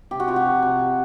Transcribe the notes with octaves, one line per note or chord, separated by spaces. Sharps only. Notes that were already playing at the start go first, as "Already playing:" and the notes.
C3 G4
F#4
C3 F4
F#4
F3
C3
C3